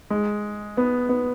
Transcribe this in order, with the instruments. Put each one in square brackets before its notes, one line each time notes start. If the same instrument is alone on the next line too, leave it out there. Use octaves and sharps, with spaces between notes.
[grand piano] G#3
B3
B3